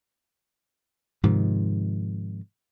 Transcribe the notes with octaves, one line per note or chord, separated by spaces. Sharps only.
G#2 C3 D#3 F3